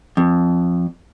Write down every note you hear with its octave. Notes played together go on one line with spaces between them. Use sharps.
F2